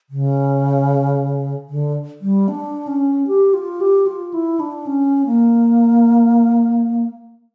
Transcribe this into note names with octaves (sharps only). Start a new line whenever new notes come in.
C#3
D3
G3
D4
C#4
G4
F4
G4
F4
E4
D4
C#4
A#3